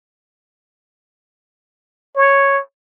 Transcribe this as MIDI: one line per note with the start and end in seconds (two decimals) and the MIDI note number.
2.16 2.60 73